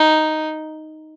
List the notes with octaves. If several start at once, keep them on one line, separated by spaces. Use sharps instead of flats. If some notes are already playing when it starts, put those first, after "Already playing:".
Already playing: D#4